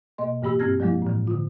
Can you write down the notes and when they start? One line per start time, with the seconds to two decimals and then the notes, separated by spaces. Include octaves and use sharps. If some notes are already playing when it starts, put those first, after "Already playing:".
0.18 B2 A#3 D#5 C6
0.42 G#2 E3 A#3 G4 B5 E6
0.59 G2 C4 G4 F6 G#6 A#6
0.80 F3 F#3 G#3 A#3 E4
1.02 A2 E3
1.27 D3 F4